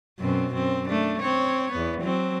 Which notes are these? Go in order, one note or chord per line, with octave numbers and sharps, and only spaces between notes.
F#2 B2 C4
F#2 C4
A3 D4
C4 C#5
E2 B3
F#3 C4